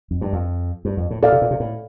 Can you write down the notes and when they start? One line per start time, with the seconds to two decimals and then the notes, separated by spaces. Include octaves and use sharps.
0.11 F2
0.21 G2
0.33 F2
0.85 G2
0.97 F2
1.11 A2
1.23 A2 A4 D5 F5
1.32 C3
1.42 A#2
1.51 C3
1.60 A2